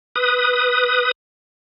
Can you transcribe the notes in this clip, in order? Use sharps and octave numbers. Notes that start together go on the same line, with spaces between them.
B4 D#6